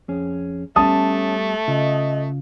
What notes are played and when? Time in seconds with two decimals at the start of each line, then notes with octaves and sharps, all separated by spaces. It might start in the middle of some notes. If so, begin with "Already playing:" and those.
0.09 F2 C#4 G#4
0.76 G3 A3 B3 C#4 A5 D#6
1.68 C#3 F4 D#5